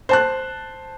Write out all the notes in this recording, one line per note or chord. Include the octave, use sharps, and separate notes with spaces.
C5 A5 F#6